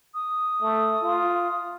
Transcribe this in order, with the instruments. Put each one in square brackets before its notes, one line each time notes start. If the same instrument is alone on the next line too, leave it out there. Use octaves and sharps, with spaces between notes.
[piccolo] D#6
[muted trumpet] A3
F4